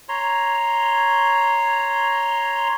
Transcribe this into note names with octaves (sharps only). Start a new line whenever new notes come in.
C#5 A#5 C6